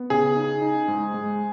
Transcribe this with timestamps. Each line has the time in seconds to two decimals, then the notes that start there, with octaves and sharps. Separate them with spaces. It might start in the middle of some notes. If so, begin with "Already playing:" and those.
Already playing: B3
0.10 C#3 G#4
0.36 D#4
0.62 D#4
0.88 G#2
1.14 G#3